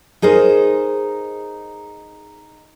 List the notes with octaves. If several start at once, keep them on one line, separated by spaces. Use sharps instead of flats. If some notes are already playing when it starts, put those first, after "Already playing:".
D#4 G#4 A#4 C5